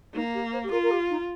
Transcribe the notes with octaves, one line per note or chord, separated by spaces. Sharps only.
A#3 D#4
G4
C5
G4
F4 A#4
A#4
G4
D#4